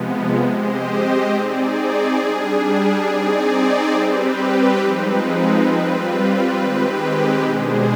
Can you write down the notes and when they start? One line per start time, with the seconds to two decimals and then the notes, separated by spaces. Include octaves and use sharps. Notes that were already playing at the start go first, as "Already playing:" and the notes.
Already playing: C3 F3 G#3 B3
0.43 G#3 C4 G4 C5 D#5
1.30 C4 D#4 G#4 D5
2.17 G3 D4 G#4
3.05 C4 D#4 G#4 D5
3.93 G3 C4 G4 B4
4.80 F3 G#3 C4 D#4 B4
5.68 G3 C4 F4 B4
6.55 D#3 G#3 C4 G4 B4
7.43 B2 G#3 D4 G#4 C5